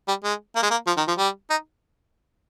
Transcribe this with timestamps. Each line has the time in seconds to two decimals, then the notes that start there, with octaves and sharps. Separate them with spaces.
0.08 G3
0.24 G#3
0.56 A#3
0.63 G#3
0.71 A#3
0.87 F3
0.97 D#3
1.08 F3
1.18 G3
1.50 D#4